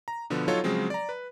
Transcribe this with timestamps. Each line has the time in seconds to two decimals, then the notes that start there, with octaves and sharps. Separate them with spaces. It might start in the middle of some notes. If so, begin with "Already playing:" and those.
0.08 A#5
0.30 B2 D3 F3 B3
0.48 F#3 D#4 F4 A4 C#5
0.64 C#3 F3 F#3 G#3 C4
0.90 D5 A#5
1.09 B4